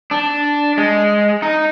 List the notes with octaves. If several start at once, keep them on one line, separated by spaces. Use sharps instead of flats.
D4
G#3
D#4